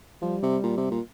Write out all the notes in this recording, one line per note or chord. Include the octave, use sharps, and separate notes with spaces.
F3 G3
C3
A#2
C3
A#2